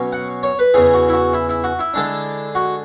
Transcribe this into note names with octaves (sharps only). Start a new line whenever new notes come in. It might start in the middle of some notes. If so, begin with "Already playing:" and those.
Already playing: B2 F#3 C#4
F#5
C#5
B4
E2 C#3 E3 G#4
F#4
E4
F#4
E4
E4
F#4
E4
D3 G#3 D4
F#4